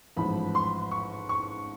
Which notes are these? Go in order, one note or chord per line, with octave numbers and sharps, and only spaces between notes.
A1 G#2 F3 B5
C6
C#6
C#6